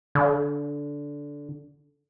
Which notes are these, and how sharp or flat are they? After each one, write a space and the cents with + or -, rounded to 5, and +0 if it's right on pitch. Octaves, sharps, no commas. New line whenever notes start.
D3 -15